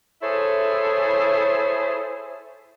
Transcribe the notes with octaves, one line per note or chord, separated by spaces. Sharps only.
E4 G#4 A4 C5 C#5 E5